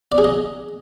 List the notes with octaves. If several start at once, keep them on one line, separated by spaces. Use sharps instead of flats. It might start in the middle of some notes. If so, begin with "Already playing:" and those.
D5
G#4
D#5